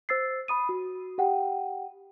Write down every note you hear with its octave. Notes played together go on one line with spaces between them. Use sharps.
C5 E6 A6 C7
B5 D#6 D#7
F#4
G4 F#5 G5